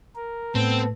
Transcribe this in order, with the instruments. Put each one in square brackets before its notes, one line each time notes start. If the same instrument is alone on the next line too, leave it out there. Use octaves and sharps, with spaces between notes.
[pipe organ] A#4
[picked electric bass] A2 [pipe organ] B3 A4 [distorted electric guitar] C4